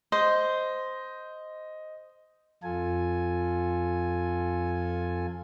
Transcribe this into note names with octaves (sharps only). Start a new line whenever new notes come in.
C5 D#5
F2 F4 A4 G#5